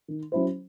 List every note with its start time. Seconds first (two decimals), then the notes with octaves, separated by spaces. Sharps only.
0.08 D#3
0.32 F#3 C#4 E4 C5